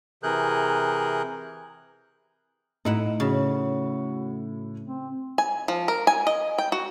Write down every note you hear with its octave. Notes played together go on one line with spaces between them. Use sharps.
C3 E3 G#4 A#4 F#6 G6
A2 D#4 E4 F#5
C#3 F#4
C4
G#5
F3
A#4
G#5
D#5
G5
F#4